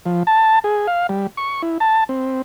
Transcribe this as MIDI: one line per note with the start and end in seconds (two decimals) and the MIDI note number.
0.06 0.23 53
0.27 0.59 81
0.64 0.87 68
0.87 1.07 77
1.09 1.27 55
1.37 1.62 85
1.62 1.78 64
1.80 2.04 81
2.09 2.42 60